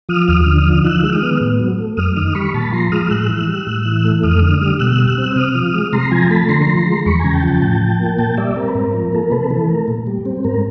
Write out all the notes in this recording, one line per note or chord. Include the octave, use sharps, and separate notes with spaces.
F3 D#6 F6
D#2 D#6 F6
D3
F3
D#3 E6 F#6
G#3
D#6 F6
B3
A2
F#3
A3
F#2 D#6 F6
D#3 D#6 F6
G3 B5 C#6
A#2 A5 B5
F3 A#5 C6
G#3 D#6 F6
A2 E6 F#6
E3
G3
A2
E3
A3
F2 D#6 F6
D3
G3
B2 E6 F#6
G3
E6 F#6
C4
F#6
C3 D#6 F6
F3
G#3
C3 A#5 C6
F3 G#5 A#5
A3 A5 B5
D3 A#5 C6
F3
G#3
E2 B5 C#6
C#3 G#5 A#5
G5 A5
F3
G5 A5
A2 G5 A5
F3
A#3
A#2 G5 A5
G3 D5 E5
C4 A#4
B4
G#2 A#4
F3
A#3 A4
A#4
C3 A4 B4
E3 A4
A3 A#4
A#2
G3
C4
G#2 A#4